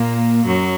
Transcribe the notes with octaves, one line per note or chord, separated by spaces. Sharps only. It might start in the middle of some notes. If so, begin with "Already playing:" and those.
Already playing: A#2 A#3
F#2 F#3